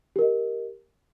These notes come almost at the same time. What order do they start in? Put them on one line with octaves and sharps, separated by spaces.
G4 A#4 D#5